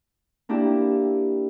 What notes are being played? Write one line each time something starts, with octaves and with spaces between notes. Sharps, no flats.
A#3 D4 E4 G4